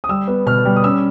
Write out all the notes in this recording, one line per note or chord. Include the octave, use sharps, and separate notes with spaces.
D#6
G3 E6
B3
B2 F6
G3
D#6
C#4 E6